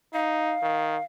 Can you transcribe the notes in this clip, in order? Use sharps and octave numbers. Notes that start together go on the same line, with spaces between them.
D#4 F5
D#3